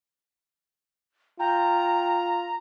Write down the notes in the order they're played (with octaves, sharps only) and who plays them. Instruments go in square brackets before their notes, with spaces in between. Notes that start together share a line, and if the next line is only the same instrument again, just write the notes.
[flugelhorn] F4 [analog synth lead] G5 [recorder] A#5